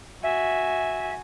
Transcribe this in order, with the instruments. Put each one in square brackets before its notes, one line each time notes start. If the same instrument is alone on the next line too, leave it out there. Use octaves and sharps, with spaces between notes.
[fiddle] F#4 G#5 [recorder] E5